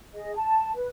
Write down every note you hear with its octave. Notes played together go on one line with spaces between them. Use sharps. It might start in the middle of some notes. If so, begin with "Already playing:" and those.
G#4 D#5
A5
B4